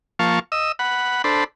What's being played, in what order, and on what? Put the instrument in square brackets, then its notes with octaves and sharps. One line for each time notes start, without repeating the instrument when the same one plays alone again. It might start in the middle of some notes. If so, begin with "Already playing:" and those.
[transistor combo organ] F3 A#3 F5 A5 C#6
D#5 E6
F#5 B5
D4 A4 C5 B5